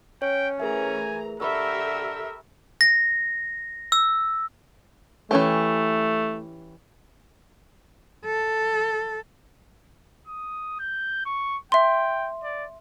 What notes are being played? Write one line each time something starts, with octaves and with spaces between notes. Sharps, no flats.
C#4 C#5 G5
E3 A3 G#4 A#4 E5 G#5 A#5
D3 G4 A4 A#4 E5 B5 C#6 E6
A#6
E6
E3 A3 C#4 G4
A4
D#6
G6
C#6
E5 G5 C6
D5